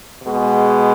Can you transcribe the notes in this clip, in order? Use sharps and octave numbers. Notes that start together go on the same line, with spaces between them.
B2 G#3